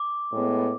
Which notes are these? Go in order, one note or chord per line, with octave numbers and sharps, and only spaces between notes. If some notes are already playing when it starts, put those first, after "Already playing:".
Already playing: D6
A2 G#3 B3